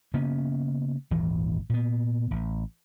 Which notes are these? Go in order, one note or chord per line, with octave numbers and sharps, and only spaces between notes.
C#3 A#3 B3 C#4
D#1 G#1 D#2 E3
A#2 B3
A1